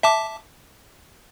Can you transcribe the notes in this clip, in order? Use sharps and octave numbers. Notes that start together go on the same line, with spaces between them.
E5 A5 D6